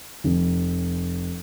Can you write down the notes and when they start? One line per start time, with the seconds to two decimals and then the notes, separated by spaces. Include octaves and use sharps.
0.24 F1